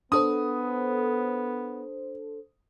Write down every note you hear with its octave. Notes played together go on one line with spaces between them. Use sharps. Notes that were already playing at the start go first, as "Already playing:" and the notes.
B3 D4 A4 C5 D#6